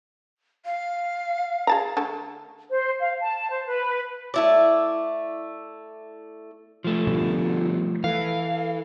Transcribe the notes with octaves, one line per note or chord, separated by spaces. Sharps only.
F5
G#4 A5 A#5
D3 A3 A5
C5
F5
A5
C5
B4
A3 E4 D5
F3 A3
B2 D3 G3 F4
E3 A4 F5